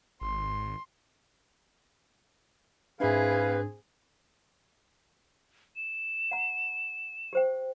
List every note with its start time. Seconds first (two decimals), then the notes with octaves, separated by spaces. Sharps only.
0.21 G#1 C6
3.00 G#2 C4 D4 E4 G#4 B4 F5 G#5
5.76 E7
6.31 F#5 A#5
7.33 G4 C5 G5